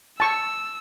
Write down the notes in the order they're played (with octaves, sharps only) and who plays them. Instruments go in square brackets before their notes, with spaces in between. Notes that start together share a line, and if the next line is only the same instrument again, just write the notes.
[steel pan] A5 C#6 [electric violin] E6